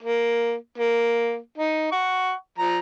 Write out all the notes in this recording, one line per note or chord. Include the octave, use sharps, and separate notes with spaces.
A#3
A#3
D#4
F#5 C#6
F3 A#5